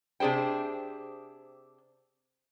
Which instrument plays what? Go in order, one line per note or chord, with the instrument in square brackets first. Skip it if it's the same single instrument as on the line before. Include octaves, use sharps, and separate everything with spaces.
[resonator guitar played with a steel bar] C3 D4 G#4 C5 G5